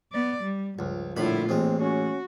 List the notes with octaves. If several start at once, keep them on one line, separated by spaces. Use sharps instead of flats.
B3 D5
G3
C#2 G2 F3
A#1 A2 D3 E4 F4 B5
A1 G#3 A#3 C4
C#4 F#4